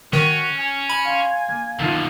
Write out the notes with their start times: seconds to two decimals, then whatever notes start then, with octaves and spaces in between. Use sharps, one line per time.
0.13 D#3 C#4 F#4
0.59 G#5
0.90 B5
1.05 F5 C6
1.48 A#3
1.79 F#2 B2 D#3 D#4 F4 A4